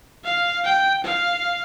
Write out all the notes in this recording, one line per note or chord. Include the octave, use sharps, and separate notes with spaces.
F5
G5
F5